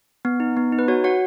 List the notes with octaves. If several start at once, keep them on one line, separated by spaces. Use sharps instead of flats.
B3
D#4
B3
D#4
B4
F#4 C#5
F#4 C#5 F#5